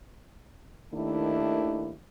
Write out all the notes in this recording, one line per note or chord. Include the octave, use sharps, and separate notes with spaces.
D#2 D#3 A3 D4 E4